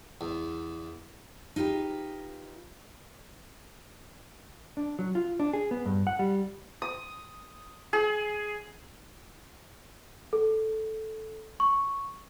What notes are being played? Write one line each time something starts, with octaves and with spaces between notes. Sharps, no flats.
E2
D#4 F4 G4 B4
D4
F#3
F4
D4
G#4
B3
G2
F#5
G3
D#6
G#4
A4
C#6